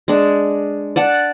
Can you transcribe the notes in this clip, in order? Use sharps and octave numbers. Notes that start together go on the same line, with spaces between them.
G#3 D4
D5 F#5 A5